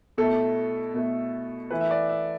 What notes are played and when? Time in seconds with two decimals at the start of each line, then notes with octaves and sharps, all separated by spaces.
0.18 B2 A3 E4 A4
0.94 B2 A3 E4
1.70 E3 A3 E4 B4
1.81 E5
1.91 D5
2.09 E5